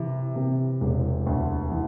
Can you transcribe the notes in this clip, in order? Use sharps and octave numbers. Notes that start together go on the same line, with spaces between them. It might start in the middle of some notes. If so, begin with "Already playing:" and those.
Already playing: C3 E3
C3
E1
D2
E3